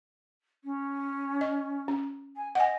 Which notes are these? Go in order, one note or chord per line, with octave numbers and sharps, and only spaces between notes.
C#4
D#5
C#4
G#5
D#5 F#5 G#5